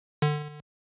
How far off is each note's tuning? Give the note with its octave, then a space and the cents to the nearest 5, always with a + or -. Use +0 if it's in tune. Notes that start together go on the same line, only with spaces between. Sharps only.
D3 +25